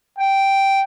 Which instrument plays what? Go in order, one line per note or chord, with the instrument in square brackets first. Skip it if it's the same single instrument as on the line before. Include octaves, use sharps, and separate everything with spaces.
[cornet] G5